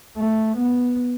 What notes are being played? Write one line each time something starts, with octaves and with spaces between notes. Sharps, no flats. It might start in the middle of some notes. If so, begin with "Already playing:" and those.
A3
B3